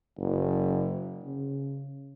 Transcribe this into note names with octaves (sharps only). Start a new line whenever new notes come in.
F#1
C#3